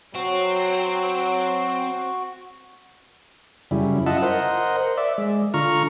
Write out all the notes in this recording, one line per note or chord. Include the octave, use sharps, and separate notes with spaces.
F#3 C4 F#4
F#2 C#3 G3 E4
F4 D#5 E5 F#5 A5
A#4 C5 D#5 F#5
D5 E5
G#3
D3 F4 A#5 C#6 F6